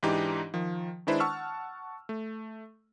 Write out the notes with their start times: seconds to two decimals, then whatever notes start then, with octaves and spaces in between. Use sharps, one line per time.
0.03 G#2 E3 D4 D#4 G4
0.54 D#3 F3
1.07 D#3 G#3 D4 E4 B4 C5
1.20 F#5 A5 C#6 E6 F6
2.09 A3